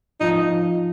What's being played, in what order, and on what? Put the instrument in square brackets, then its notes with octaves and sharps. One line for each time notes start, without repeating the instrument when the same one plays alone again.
[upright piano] F3 [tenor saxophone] D#4